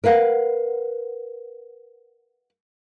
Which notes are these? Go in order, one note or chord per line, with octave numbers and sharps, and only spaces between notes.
A#4 B4 F5 F#5